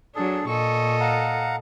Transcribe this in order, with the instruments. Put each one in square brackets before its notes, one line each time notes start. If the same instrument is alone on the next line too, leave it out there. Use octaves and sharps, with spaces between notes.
[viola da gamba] F#3 D4 [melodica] G#4 A4
[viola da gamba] A#2 A4 D#5 [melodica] C#6
[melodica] F5 F#5 A#5